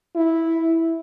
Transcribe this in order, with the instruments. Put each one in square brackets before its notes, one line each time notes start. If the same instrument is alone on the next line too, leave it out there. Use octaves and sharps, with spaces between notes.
[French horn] E4